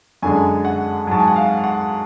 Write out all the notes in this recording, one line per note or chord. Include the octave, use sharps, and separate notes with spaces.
F#2 D3 G#3 G#5
F#5
G#2 F#3 A5
G#5
F#5
F5
F#5